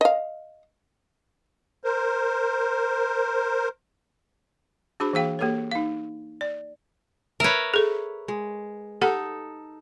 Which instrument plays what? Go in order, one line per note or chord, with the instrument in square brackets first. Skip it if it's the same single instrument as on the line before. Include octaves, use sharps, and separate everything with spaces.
[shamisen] D#5 F5
[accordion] A#4 C5
[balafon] D4 F#4 G#4 C5 B5
E3 A#3 G#4 F5 G5
A#3 G4 A4 B4 C#5
D#4 F5
D5
[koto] A#4 B4 [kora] C#5 E5
[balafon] G#4 A4
[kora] G#3
[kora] D#4 A4 [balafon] G4 F#5